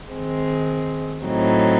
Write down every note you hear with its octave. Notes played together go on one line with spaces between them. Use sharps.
D#3 G#3 C4
A2 F#3 C4 D#4